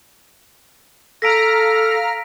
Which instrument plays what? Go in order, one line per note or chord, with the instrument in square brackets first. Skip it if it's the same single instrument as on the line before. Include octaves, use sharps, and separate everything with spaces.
[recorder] A4 [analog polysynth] F5 A#5 F6 [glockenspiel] A#6 B6 D7